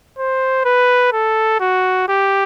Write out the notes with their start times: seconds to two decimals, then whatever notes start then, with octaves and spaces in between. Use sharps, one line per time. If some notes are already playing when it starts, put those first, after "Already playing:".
0.18 C5
0.65 B4
1.13 A4
1.60 F#4
2.08 G4